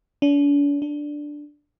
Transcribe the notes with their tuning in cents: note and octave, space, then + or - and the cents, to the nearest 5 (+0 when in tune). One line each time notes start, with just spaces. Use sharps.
D4 -45
D4 +0